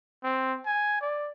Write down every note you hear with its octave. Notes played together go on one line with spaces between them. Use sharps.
C4
G#5
D5